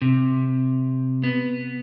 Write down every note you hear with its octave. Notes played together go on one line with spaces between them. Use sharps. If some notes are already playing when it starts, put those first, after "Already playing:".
C3
B3